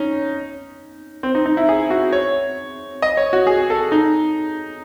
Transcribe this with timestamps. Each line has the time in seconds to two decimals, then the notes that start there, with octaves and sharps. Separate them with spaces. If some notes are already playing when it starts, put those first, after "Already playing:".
Already playing: C#4 D#4
1.23 C4
1.35 D#4
1.46 D#4
1.57 E4
1.69 G#4
1.90 F#4
2.12 C#5
3.02 D#5
3.17 C#5
3.33 F#4
3.47 G#4
3.70 A4
3.92 D#4